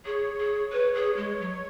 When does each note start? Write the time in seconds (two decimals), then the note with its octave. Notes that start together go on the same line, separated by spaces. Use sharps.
0.06 G#4 C#5
0.38 G#4
0.72 B4 C#5
0.95 G#4
1.17 G#3
1.40 F#3